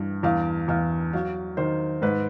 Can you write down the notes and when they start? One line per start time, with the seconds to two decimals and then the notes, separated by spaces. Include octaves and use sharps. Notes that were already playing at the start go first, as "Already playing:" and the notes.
Already playing: G2 E3
0.23 E2 F5
0.68 E2 F5
1.13 F#3 F5
1.57 D#3 C5
2.02 G#2 B4